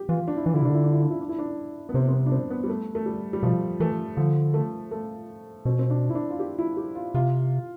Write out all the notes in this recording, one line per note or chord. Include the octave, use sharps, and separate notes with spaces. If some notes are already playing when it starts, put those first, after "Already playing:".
Already playing: G4
E3 F4
D4
E4
E3 D4
D3 E4
C3
D4
D3 E4
D4
E4
D4
E4
D4
E4
D4
B3
C3 C4
C4
B3
D4
C4
B3
G3
A3
A3
G3
G3
B2 F3
E3 A3
D3 F3
A3
A3
B2 C4
C4
D4
E4
D4
F4
G4
E4
G4
F4
C3 F4